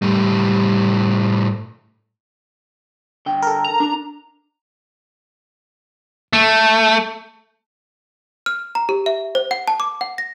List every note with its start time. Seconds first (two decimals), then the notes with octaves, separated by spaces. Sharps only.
0.02 A2 G3
3.26 D3 G5
3.42 A4 A#4
3.64 A#5
3.80 D4
6.33 A3
8.46 F6
8.75 A#5
8.89 G4
9.06 E5
9.35 C5
9.51 F#5
9.68 A5
9.80 D6
10.01 F#5
10.18 A#6